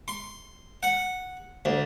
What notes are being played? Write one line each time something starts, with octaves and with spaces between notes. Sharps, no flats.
C6
F#5
D2